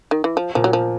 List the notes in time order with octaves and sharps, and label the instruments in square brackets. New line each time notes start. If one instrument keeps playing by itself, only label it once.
[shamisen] D#3
E3
F3
[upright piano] A#2 [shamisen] F3
[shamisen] F#3
F3